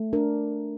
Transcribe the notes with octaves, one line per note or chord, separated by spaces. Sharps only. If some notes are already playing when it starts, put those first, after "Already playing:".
Already playing: A3
D4 A#4